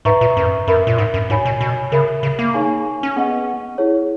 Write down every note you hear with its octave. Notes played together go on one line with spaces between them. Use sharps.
G#2 B4 E5 A#5 C#6
A#2
F#2
F#2 A#4 E5 B5
A#2
G#2
F#2
G#2 F#4 C#5 G#5 B5
B2
B2
C#3 A#4 E5 B5
C#3
A#3
D#4 G#4 C#5 G#5 C#6
C#4
B3 G#4 D#5 F#5 C#6
E4 G#4 C#5